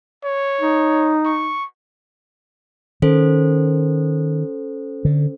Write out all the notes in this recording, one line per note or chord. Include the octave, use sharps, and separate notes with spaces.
C#5
D#4
C#6
D#3 C#4 A4 C5
D3